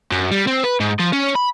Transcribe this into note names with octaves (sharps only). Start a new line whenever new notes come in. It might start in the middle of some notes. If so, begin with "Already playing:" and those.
F#2
G3
C4
B4
G#2
F3
C#4
B5